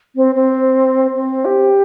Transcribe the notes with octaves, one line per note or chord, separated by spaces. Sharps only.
C4
C4
C4
G4